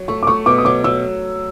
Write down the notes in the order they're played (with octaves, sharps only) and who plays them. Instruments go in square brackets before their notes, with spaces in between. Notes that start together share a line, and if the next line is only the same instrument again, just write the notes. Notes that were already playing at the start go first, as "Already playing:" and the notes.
Already playing: [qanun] F#3
[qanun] A3 [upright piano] C#6
[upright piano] D6
[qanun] A3 [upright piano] C#6
[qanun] B2 [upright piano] D6
[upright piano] D#6
[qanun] F#3 [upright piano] D6
[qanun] F#3 [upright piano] E6